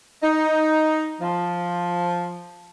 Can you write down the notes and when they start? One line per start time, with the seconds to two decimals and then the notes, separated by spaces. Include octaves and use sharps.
0.23 D#4
1.21 F3